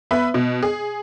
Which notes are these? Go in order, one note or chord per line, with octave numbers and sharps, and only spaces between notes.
B3 B4 E5
B2
G#4